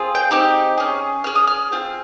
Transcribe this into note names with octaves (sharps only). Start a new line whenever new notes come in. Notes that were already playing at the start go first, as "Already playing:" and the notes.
Already playing: C4 F4 G#4
G5
C4 D#4 G4
C#4 G#4
C#4 G#4 F6
D#6
F6
C4 F4 G#4